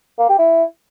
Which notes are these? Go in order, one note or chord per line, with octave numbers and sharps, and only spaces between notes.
A#3
G4
E4